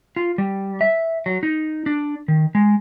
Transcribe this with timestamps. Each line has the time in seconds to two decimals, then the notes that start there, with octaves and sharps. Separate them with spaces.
0.16 F4
0.38 G3
0.81 E5
1.26 F#3
1.43 D#4
1.86 D4
2.28 D#3
2.55 G#3